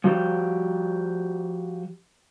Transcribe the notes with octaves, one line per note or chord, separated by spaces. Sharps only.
F3 F#4 G4